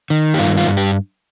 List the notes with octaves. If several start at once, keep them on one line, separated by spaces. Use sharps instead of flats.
D#3
G4
G2 F4
F4
G2
G4